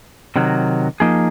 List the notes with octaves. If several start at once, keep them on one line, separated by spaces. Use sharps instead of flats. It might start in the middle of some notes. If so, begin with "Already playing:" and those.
C3 D#3 F#3
F3 A#3 D#4 G#4